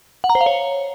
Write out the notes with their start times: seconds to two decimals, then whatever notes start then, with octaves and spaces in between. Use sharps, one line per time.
0.24 F#5
0.30 A#5
0.35 C5
0.41 F5
0.46 C#5